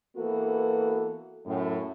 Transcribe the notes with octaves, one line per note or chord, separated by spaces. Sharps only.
E3 A#3 B3 F#4 A4
F#2 A2